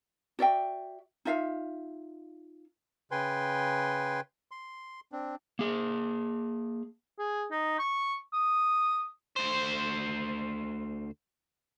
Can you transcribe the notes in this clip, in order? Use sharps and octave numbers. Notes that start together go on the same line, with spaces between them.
F#4 D5 E5 G5
D#4 F4 E5 F5
C#3 B4 G5 G#5 C6
C6
C4 D4
A#3 G#4
G#4
D#4
C#6
D#6
D2 C5